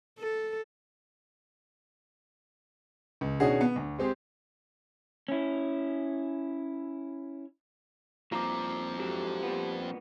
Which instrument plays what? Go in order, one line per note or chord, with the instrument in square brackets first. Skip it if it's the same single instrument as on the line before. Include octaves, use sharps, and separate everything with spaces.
[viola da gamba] A4
[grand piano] C#2
B2 D#3 C#4 D4 F#4 G#4
B3
D2
G#3 C4 G4 G#4
[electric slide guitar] C#4 E4
[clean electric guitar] C2 G2 A#2 [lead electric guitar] F3 C4 [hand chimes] A#5 D6
[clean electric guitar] G#2 D3 F#3 [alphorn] G4
[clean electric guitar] G2 A#2 B3